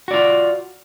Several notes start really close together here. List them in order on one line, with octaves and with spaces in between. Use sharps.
F#4 D5 F4